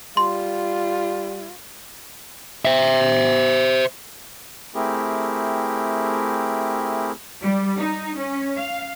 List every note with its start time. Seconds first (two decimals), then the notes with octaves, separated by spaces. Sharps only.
0.17 G3 F4 C6
2.65 C5 E5
4.75 A3 C4 E4 G4 G#4 A#4
7.42 G3
7.78 D#4
8.17 C#4
8.57 F5